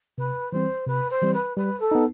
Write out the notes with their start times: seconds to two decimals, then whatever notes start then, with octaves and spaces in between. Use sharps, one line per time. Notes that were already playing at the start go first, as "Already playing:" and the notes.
0.18 C3 B4
0.52 E3 G3 C4 C5
0.87 C3 B4
1.10 C5
1.22 E3 G3 C4
1.33 B4
1.57 G3 B4
1.80 A4
1.91 B3 D#4